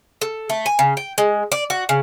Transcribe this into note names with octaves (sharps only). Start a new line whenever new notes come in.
A4
A3
G#5
C#3
G5
G#3
D5
F#4
C#3